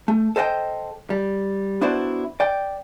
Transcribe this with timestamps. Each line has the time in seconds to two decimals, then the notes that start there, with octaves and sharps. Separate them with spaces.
0.08 A3
0.36 A4 C5 D#5 F#5 G5
1.10 G3
1.81 B3 D4 E4 F#4 C5 D5
2.40 D5 G5